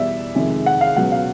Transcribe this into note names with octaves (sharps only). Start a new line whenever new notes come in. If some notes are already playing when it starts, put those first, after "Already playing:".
Already playing: E2 B2 G3 D5 E5
F2 C3 D#3 G#3
F#5
F5
C#2 B2 F#3 F#5
F5